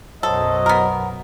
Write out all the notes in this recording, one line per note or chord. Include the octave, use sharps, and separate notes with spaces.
B1 F#2 F#3 A4 C5 D#5
B3 A#4